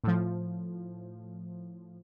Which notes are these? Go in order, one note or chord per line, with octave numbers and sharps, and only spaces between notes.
A2 F3